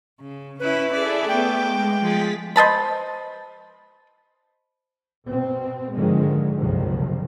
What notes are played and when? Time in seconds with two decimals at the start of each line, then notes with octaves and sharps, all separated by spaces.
0.20 C#3
0.60 C#4 E4 B4
0.93 E4 G#4 A4 D5 E5
1.28 A3 B3 G5 D6
1.64 G#3
2.00 F3 G#3 G#4 A6 B6
2.56 C5 D#5 A5 B5
5.27 B2 C4
5.95 G#2 D3 D#3 F3 G#3
6.59 F#1 C2 F2 C3 D#3 F3